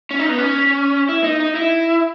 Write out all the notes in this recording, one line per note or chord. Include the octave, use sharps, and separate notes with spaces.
C#4
D#4
B3
C#4
E4
D#4
D#4
E4